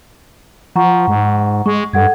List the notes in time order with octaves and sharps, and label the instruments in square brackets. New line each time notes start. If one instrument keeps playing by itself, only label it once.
[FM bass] F3 [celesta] F#5 A#5 C#6
[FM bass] G#2
[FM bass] G#3 [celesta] C#6
[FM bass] G2 [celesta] A4 F#5 G#6